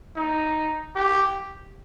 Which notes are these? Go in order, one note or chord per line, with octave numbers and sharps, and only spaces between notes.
D#4
G4